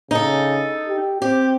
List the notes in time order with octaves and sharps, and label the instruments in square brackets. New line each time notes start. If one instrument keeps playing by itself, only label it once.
[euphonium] C#3 [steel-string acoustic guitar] D#4 A4
[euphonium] G4
[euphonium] C4 [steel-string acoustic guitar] G4